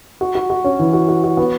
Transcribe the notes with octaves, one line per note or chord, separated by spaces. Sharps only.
F#4
F#4
F#4
C#4
E3
F#4
F#4
F#4
B3